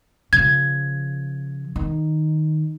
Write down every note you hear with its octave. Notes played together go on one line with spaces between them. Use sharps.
C#3 F3 G#6
D#3